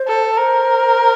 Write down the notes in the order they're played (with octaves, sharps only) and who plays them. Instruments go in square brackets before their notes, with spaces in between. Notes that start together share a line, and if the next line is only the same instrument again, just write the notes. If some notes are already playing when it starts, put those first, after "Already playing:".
Already playing: [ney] C5
[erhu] A4
[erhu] A#4 [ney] C5